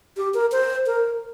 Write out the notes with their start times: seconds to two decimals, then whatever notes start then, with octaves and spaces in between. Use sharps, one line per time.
0.17 G4
0.34 A#4
0.52 C5
0.86 A#4